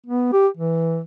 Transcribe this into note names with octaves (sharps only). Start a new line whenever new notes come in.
B3
G4
E3